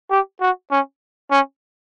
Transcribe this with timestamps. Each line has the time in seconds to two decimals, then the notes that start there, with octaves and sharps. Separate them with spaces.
0.10 G4
0.41 F#4
0.71 C#4
1.31 C#4